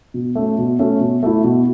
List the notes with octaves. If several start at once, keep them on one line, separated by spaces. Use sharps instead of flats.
B2
A3 C#4
B2
A3 C#4
B2
A3 E4
B2